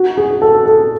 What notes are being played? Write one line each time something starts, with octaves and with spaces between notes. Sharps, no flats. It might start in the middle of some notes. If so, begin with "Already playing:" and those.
Already playing: F#4
G#4
A4
A4